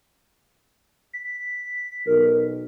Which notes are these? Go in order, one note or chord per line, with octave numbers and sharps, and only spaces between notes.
B6
B1 A#4